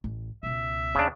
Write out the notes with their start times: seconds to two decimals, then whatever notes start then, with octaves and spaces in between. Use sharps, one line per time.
0.04 A1
0.43 C#2 B2 E5
0.95 D#2 C#3 D4